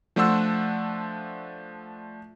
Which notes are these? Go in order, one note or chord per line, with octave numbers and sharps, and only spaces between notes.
F3 A3 D4 F#5 C6 E6